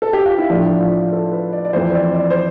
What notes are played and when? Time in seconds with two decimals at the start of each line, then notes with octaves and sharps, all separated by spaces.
0.02 A4
0.13 G4
0.26 F4
0.38 E4
0.50 A2 F3 D4
0.80 F4
1.12 A4
1.32 B4
1.53 D5
1.65 D5
1.73 F2 E3 C5
1.95 D5
2.14 D5
2.30 C5